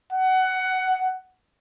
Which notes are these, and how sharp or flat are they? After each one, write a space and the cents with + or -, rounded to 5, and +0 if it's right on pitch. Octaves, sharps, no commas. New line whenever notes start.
F#5 +15